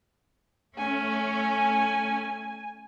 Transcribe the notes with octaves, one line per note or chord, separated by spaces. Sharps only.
A3 C#4 G#5